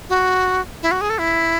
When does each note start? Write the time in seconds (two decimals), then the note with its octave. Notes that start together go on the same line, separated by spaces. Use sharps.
0.09 F#4
0.82 E4
0.91 F#4
1.01 G#4
1.10 A4
1.18 E4